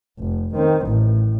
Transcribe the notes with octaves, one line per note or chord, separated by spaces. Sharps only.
F1
D#3 C4
A1 A2